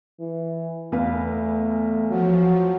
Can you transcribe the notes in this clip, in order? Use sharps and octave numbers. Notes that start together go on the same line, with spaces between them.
E3
E2 A3 B4 F5
F3 F#3